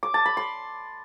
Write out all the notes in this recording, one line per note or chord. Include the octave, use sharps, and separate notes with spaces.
D6
A5
B5
C6